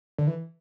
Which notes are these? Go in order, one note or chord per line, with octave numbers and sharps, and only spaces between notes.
D3
E3